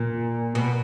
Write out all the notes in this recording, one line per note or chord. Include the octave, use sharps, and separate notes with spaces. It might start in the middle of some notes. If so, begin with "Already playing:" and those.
Already playing: A#2
B2